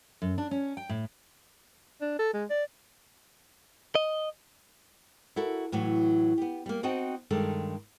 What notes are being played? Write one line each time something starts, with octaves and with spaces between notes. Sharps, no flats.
F#2
D4
C#4
G5
A2
D4
A4
G#3
D5
D#5
E4 F#4 A4 A#4
A2 E3 F#3
B3 G4
G3 A#3
C4 D#4 F#4 D#5 G5 A5
G2 D#3 G#3 A4